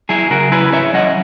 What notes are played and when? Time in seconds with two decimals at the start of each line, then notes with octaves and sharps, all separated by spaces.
0.09 F#3 E4 G#4
0.30 C#3 F#4 A#4
0.52 E4 G#4 B4
0.72 C#4 C#5 E5
0.94 F#3 D#5 F#5